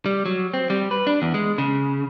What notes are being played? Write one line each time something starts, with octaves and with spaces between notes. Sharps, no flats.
G3
F#3
C4
G3
B4
D4
E2
G#3
C#3